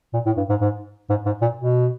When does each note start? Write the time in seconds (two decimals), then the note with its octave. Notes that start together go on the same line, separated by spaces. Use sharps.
0.13 A#2
0.26 A2
0.37 G2
0.49 G#2
0.61 G#2
1.09 G#2
1.26 G#2
1.41 A#2
1.57 B2